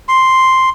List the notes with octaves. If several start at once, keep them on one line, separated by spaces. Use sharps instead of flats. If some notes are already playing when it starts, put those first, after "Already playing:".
C6